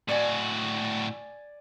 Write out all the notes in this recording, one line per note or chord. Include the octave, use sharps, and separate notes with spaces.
A2 F#4 D5 G#5